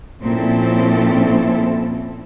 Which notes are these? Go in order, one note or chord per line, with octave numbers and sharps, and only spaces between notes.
A#2 F3 C4 C#4 E4 A4